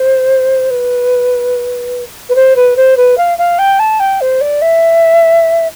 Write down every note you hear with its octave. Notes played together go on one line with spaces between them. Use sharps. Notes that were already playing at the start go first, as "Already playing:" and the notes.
Already playing: C5
B4
B4
C5
B4
C5
B4
F5
F5
G5
A5
G5
C5
D5
E5